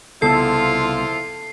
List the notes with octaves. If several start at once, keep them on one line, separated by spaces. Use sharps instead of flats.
C2 C#3 F3 B3 E4 F4 A4 C7